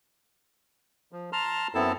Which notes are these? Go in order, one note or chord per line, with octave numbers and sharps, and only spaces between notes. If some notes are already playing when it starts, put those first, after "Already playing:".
F3
A5 A#5 C6 F6
F#2 B3 C4 E4 A4 A5